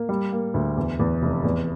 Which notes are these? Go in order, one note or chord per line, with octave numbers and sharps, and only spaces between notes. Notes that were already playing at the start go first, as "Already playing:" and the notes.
Already playing: A#3
G3
A#3
D2
E2
E2
F1
E2